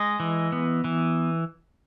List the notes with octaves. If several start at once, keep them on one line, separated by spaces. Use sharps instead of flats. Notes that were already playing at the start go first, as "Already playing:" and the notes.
Already playing: G#3 D#5
E3
B3
E3